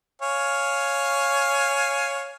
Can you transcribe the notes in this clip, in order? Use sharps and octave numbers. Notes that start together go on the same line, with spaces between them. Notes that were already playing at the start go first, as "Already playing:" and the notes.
C#5 F5 G#5